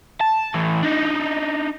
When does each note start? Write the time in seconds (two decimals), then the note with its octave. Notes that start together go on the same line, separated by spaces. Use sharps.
0.21 A5
0.54 A2 E3
0.83 D4 D#4